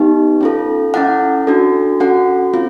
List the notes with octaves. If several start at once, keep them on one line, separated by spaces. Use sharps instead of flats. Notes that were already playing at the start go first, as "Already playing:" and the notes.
Already playing: B3 D#4 G4
C#4 F4 A4
C#4 E4 A4 F#5
D4 F#4 A4
C#4 F#4 A4 F#5
C4 F4